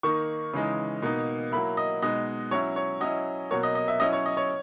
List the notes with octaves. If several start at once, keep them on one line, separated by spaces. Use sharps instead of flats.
D#3 A#3 D#4 C#6
C#3 E3 G#3 D#4
B2 A#3 D#4
F#3 A#3 E4 B5
D#5
B2 G#3 D#4 D#5
F#3 C#4 E4 C#5
C#5
F#3 C#4 E4 D#5
B2 F#3 A#3 C#5
D#5
D#5
E5
F#3 C#4 E4 D#5
C#5
D#5
C#5